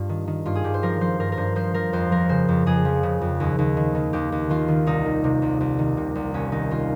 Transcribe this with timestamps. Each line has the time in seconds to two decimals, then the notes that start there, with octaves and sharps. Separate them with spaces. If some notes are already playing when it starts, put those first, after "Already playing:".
Already playing: G2 F4 G4
0.09 D#3
0.27 D#3
0.45 G2 F4
0.55 G#4
0.64 G2 G4
0.74 C5
0.83 F3 A#4
1.01 F3 C5
1.19 G2 A#4
1.32 A#4
1.37 G2 C5
1.56 F3 C5
1.74 F3 A#4
1.93 F2 C5
2.11 F3 A#4
2.29 C#3 C5
2.48 F2
2.66 F2 G#4
2.85 F3
3.03 C#3
3.21 F2
3.40 D#2
3.59 D#2
3.77 D#3
3.95 D#3
4.13 D#2 G4
4.32 D#2
4.50 D#3 F4
4.68 D#3
4.86 C2 D#4
5.06 D#3
5.24 C3
5.42 C2
5.60 C2
5.79 D#3
5.97 C3
6.15 C2
6.34 D#2 C#4
6.52 D#2 D#4
6.70 D#3 F4